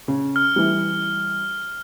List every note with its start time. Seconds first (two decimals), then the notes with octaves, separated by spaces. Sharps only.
0.08 C#3
0.36 F6
0.56 E3 G3